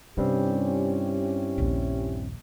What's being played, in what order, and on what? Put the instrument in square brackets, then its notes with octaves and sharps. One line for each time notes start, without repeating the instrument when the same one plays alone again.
[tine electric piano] G2 G3 C4 [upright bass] C3 [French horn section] C#4 E4 G4
[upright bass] A#1 D#2